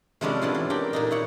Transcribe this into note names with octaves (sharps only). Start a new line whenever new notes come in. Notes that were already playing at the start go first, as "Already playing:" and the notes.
C3 F3 G3 G#3 C#4 D4
B3 D4 E4 F4
E3
D4 G4 A#4 G5
A#2 D4 D#4
E4 C#5 F#5